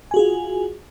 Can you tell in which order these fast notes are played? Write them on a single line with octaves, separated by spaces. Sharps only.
G#5 F#4 G#4 F4